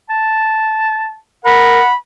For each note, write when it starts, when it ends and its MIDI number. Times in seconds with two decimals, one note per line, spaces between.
0.10 1.14 81
1.45 1.81 70
1.45 1.91 78
1.45 1.94 83